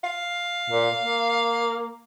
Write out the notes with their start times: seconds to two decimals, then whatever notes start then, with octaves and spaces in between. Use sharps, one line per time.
0.04 F5
0.70 A#2
1.00 A#3